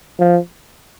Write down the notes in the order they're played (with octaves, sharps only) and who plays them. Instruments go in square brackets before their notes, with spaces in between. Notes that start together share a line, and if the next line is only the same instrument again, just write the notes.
[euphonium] F3